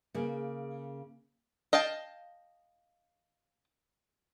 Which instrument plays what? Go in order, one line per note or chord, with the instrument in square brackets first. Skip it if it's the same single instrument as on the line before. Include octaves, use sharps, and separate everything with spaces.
[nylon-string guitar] C#3 A#3
[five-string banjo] D#5 F5 G5 A5